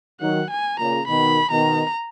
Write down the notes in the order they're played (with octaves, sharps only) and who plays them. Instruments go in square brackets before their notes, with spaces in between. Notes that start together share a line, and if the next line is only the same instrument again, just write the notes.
[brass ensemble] D#3 F#3 [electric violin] F#5
[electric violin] G#5
[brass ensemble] A#2 C#3 [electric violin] A#5
[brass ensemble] B2 D#3 [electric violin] B5
[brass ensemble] B2 D#3 [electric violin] A#5